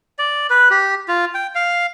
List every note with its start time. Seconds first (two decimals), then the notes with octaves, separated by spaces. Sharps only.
0.19 D5
0.50 B4
0.71 G4
1.08 F4
1.34 G5
1.55 F5